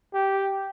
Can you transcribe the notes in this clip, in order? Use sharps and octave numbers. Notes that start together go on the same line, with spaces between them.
G4